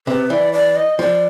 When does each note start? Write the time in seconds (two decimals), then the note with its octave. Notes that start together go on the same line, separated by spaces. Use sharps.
0.07 C3 B4
0.30 E3 D5
0.53 D5
0.76 D#5
0.99 F3 D5